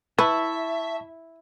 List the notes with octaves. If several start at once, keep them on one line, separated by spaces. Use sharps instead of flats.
E4 B4 E5 A5 C#6